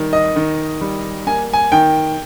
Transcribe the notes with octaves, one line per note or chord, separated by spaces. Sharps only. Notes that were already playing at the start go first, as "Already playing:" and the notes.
Already playing: D#3 G3
D#5
D#3
G3
A#3 G#5
G#5
D#3 G5